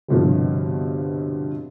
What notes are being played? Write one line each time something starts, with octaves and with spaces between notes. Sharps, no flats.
G1 C2 G2 B2 F3